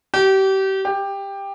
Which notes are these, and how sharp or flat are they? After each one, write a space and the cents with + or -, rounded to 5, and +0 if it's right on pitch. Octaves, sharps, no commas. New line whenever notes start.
G4 -30
G4 +15